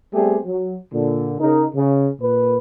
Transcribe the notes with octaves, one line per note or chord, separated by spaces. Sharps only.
G3 A3 B3 C4 G4 G#4
F#3
A#2 D3
C#3 D#4 A#4
C#3
A#2 B4